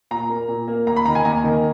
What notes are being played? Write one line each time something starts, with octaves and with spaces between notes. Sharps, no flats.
A#2 A#5
A#3
A#2
A#3
D#2 A#5
B5
D#3 A#3 A#5
G#5
D#2 A#5
D#3 A#3